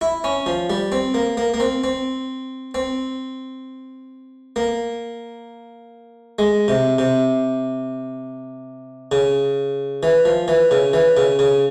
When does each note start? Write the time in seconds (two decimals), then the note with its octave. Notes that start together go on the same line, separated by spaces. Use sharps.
0.01 E4
0.24 C#4
0.46 F3
0.70 G3
0.92 C4
1.14 A#3
1.37 A#3
1.54 A#3
1.60 C4
1.84 C4
2.75 C4
4.56 A#3
6.39 G#3
6.68 C3
6.98 C3
9.12 C#3
10.03 E3
10.25 F3
10.48 E3
10.71 C#3
10.93 E3
11.17 C#3
11.39 C#3